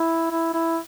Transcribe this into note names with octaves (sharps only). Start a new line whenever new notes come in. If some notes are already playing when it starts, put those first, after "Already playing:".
Already playing: E4
E4
E4